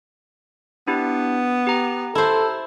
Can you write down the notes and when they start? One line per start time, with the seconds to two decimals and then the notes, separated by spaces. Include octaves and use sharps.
0.87 B3 D4 E4 G4
1.67 G4 A#5
2.15 E4 A4 C5